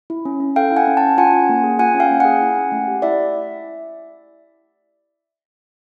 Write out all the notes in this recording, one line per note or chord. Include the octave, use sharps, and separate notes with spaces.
E4
C#4
C#4
A4 F5 G5
E4 F#5 G#5
C#4
G5 A5
C#4
F4 F#5 G#5
C#4
A#3
G#4
F4 F#5 G#5
C#4
F5 G5
A#3
G#4 F#5 G#5
E4
C#4
A3
G4
E4 D5 E5